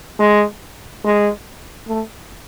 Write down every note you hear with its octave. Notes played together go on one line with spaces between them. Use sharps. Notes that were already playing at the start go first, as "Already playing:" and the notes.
G#3
G#3
A3